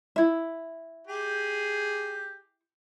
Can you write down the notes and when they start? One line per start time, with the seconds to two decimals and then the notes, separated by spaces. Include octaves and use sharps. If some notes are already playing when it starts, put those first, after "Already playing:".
0.16 E4 E5
1.07 G4 G#4